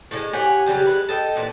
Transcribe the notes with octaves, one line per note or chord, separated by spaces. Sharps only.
A2 G3 G#3
G4 C#5 F#5 G#5
C#3 F#3 G3 G4
G#3 B4
A4 D#5 G5
A#2 E3 D4 A4